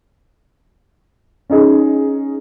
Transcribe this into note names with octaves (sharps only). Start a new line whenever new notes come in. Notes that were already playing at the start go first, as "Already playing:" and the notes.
C#4 D#4 G#4